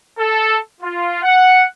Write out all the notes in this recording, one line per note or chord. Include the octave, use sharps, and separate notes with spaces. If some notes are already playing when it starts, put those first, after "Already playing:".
A4
F4
F#5